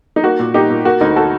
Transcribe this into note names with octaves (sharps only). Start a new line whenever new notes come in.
D#4
A#3 F#4
A#2
A#2 D#4 G4
A#2
A#3 F#4
D2 D#4
F#4 A4